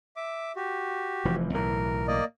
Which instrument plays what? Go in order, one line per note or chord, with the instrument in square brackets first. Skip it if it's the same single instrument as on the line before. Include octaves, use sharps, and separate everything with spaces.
[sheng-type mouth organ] E5 D6
F#4 G4
[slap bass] F1 E3 F3
[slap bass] B1 A2 E3 [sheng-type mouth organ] A#4
[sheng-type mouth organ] A#3 D5 D#5